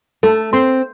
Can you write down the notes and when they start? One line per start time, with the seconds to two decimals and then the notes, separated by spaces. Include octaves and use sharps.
0.23 A3 A4
0.53 C4 C6